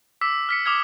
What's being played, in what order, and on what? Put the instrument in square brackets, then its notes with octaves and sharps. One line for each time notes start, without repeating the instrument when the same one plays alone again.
[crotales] D6 E6 B6
F6 B6 C#7
D6 D#6 F6 G#6